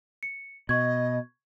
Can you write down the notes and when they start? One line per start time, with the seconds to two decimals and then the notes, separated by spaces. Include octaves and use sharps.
0.23 C#7
0.69 B2 D#5 C#6 G#6